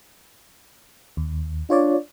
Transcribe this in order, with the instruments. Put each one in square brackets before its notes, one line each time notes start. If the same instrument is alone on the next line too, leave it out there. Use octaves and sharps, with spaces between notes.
[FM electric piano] D#2
[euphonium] D4 [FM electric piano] F4 C#5 D5